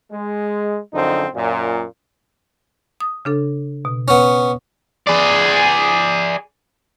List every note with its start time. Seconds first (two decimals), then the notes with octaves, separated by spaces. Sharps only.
0.11 G#3
0.93 F#2 D3 F3 C4 D#4
1.34 F#2 A#2
3.00 D#6
3.25 C#3 D4 A4
3.85 B2
4.08 B3 C#4
5.07 G#4 D5